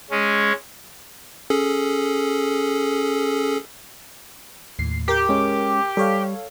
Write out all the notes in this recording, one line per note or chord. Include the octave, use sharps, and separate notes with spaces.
G#3 C#4
C#4 G#4 A4
D#2 A2 C7
G4 A#4 D6
G#3 C#4
G3 A4 C#5 F5